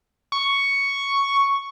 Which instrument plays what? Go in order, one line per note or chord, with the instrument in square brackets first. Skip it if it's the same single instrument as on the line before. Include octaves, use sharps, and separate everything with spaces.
[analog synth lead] C#6